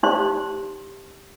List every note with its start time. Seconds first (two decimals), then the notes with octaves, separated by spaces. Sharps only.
0.03 D#4 G4 C5 C6